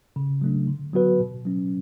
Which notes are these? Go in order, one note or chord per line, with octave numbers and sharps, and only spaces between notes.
C#3
F#3 A3 D4
D3
F#3 B3 F#4 B4
B2
F#3 C#4